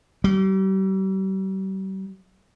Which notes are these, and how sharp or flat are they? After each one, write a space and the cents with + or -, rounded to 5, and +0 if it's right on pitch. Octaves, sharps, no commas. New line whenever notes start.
G3 -40